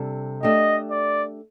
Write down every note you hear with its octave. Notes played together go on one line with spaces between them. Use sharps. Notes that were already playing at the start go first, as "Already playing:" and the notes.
Already playing: C3 G3 D4 A4
A3 D4 G4 D#5
D5